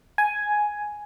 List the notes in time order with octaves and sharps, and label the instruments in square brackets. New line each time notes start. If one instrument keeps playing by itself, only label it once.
[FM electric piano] G#5